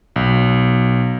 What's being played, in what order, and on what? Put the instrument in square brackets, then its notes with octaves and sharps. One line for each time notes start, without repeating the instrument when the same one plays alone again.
[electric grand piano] B1